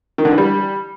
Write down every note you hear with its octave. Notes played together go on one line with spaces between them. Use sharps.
D#3
D3
E3
G3